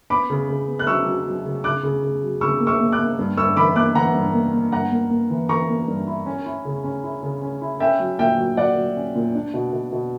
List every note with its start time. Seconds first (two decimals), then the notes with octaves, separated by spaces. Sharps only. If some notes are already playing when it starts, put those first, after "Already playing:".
0.10 B3 B5 D6
0.30 C#3
0.48 C#3
0.68 B3
0.79 F#6
0.87 F#3 C#6 E6
1.06 F#3
1.26 F#3
1.45 C#3
1.64 C#3 D6 F#6
1.83 C#3
2.03 C#3
2.22 F#3
2.41 C#3 C#6 E6
2.61 A#3
2.67 C#6 E6
2.80 A#3
2.92 D6 F#6
2.99 A#3
3.19 G2
3.37 G2 C#6 E6
3.57 E3 B5 D6
3.76 A#3 D6 F#6
3.95 E3 F#5 A#5
4.14 G2
4.34 A#3
4.53 A#3
4.72 G2 F#5 A#5
4.92 A#3
5.10 A#3
5.30 E3
5.49 E3 A#5 C#6
5.69 A#3
5.88 G2
6.07 E4
6.26 C#4
6.46 E4
6.65 C#3
6.84 C#4
7.03 E4
7.23 C#3
7.42 C#4
7.61 E4
7.80 C#4 E5 G5
8.00 F#3
8.19 A#2 E5 G5
8.38 F#3
8.57 F#3 D5 F#5
8.76 F#3
8.96 C#4
9.15 A#2
9.35 D4
9.54 B2
9.73 B2
9.92 B2